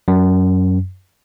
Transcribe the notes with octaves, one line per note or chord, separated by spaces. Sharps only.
F#2